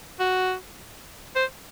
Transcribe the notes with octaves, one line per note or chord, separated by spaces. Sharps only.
F#4
C5